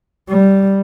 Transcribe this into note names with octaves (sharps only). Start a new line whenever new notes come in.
G3